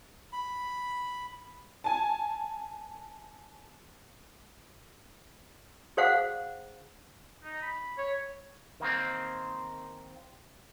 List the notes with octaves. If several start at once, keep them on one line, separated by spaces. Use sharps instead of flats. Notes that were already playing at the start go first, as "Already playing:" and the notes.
B5
G#5 A5
G#4 C5 F5 F#5
D#4
B5
C#5
D#3 A#3 C4